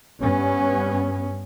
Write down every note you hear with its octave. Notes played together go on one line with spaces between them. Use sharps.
G2 B3 C#4